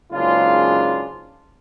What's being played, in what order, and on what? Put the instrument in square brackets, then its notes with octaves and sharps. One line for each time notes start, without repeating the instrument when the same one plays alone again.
[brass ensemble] F#1 G#2 C#3 D4 F4